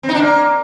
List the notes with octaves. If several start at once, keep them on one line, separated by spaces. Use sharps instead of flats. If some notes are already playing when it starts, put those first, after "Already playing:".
C4
D#4
D4
A#3